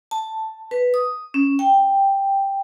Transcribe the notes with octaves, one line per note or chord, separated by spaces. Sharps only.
A5
B4
D#6
C#4
G5